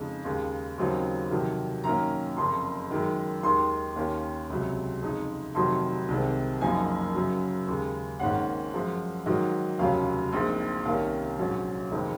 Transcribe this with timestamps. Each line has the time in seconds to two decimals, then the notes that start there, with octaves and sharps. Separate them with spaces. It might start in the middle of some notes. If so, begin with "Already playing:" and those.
Already playing: F2 C#3 G#3 D#4
0.25 D#2 C#3 G#3
0.78 D#2 C#3 F#3 C4 D#4
1.31 F2 C3 D#3 F#3
1.84 F#2 D#3 A#3 C#4 A#5
2.37 F#1 F2 C#3 C6
2.91 F#2 D#3 G#3
3.43 D#2 D#3 G#3 D#4 C6
3.96 D#2 D#3 A#3 C#4
4.50 C#2 C3 F#3
5.02 F2 C#3 G#3 D#4
5.55 F1 F2 C3 D#3 F#3 C6
6.08 C2 C3 D#3 G#3 C4
6.61 F#1 F#2 F3 A#3 D#4 G#5
7.15 F#2 C#3 F#3
7.67 D#2 C#3 G#3
8.20 G#1 G#2 D#3 A#3 C#4 F#5
8.73 F#2 F3 G#3
9.26 G#2 D#3 F#3 D#5
9.79 F1 D#2 C#3 F#3 C#4 F5
10.32 A#1 A#2 G#3 C4 D#4
10.85 C2 C3 D#3 A#3 C#4 F5
11.38 A#1 G#2 F#3 C#4
11.91 F1 F2 D#3 G#3 C4